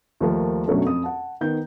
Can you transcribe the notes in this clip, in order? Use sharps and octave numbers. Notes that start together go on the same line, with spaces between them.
D#2 F3 A3 A#3
F#2 B2 F#3 A3 C#4 D4
F2 D#6
F#5 A5
D#3 B3 G6